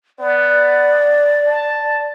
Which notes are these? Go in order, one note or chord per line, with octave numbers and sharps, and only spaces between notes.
B3 D5
A5